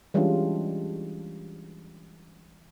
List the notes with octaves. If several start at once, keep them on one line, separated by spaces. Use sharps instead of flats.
E3 G3 G#3 C#4 D4 F4